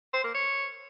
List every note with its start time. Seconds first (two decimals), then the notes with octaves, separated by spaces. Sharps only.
0.14 C5
0.24 A#3
0.34 C#5